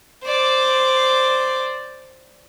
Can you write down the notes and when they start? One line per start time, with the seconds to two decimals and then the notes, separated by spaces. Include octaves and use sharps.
0.25 C5 D5